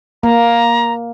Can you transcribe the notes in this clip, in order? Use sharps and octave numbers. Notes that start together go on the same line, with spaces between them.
A#3 A#5